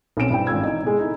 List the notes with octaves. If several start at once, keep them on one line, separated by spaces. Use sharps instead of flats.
B1 C4 C#4 D7 E7
G2 E4 G5
G#1 C#4 F4 E6 G#6
E3 D#4
B2 G#3
D#4 E4 A4